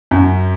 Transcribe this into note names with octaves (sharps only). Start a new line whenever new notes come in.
F#2